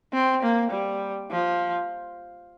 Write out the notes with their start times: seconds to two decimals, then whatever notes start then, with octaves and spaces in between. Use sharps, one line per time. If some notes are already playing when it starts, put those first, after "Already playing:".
0.14 C4
0.43 A#3
0.71 G3
1.31 F3